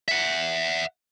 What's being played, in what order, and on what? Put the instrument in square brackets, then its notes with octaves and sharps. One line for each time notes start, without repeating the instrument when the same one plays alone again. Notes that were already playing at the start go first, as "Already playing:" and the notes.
[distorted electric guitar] E5 F#5